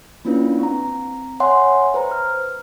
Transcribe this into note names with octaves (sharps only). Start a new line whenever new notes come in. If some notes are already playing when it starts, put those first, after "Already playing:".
A#3 C#4 D4 E4 F4 B4
C4 A#5
C#5 E5 F#5 G#5 C6
B4 C5 A#5
F6